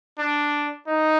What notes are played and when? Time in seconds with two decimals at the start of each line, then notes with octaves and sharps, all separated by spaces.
0.19 D4
0.88 D#4